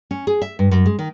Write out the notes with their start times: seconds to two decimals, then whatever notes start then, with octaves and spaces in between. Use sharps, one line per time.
0.11 C#4
0.27 G#4
0.42 E5
0.59 G2
0.71 F#2
0.86 G#3
0.99 D#3